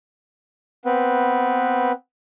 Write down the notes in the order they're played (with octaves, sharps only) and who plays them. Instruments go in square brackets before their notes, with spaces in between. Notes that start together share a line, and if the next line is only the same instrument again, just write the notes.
[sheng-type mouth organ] B3 C4 B4